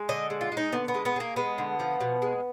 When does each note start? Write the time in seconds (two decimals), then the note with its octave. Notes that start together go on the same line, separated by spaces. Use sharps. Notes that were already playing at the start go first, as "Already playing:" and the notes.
Already playing: G#3
0.09 D3 D#5
0.30 G#3
0.41 F4
0.52 G#3
0.57 D#4
0.72 D3 B3
0.88 B3
0.94 G#3
1.05 B3
1.16 G#3 A#3
1.36 G#3 B3
1.58 D3
1.80 F3
2.01 B2
2.22 G#3